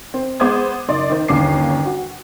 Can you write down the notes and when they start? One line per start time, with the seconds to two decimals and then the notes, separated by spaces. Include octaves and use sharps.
0.14 C4
0.40 G#3 B3 C5 D6 D#6 G#6
0.89 F#1 D#4 D5 C6
1.10 D#3 C5
1.28 G1 D#2 C#4 C#5 D6 C7
1.85 F#4